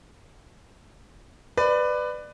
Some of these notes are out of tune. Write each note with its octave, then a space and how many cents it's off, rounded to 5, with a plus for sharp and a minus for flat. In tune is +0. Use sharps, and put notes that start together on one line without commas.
B4 +15 D5 +20